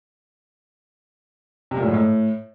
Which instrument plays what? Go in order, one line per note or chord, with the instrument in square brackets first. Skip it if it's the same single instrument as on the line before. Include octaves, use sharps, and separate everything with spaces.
[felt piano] C3
A#2
A2
G#2
A2